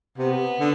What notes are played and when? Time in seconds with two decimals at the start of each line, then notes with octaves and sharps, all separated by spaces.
0.18 C3 B3
0.59 D3